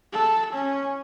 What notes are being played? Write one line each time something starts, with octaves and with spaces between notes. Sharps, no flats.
A4
C#4